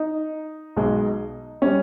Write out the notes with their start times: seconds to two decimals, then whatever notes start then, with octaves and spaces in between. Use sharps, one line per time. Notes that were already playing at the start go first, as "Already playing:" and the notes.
Already playing: D#4
0.76 B1 B2 G#3
1.62 G3 C#4